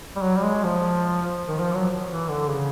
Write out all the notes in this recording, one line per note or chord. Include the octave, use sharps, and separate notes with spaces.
G3
F#3
G3
G#3
F3
D#3
F3
F#3
E3
D3
C#3